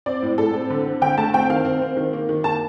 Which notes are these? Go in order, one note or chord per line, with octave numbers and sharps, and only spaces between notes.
C4 D5
A2
A2 A4
C4
D3
C4
D3 G5
A3 A5
C4 G5
D#3 F5
C4
C4
D#3
A#3
D#3
A#3 A5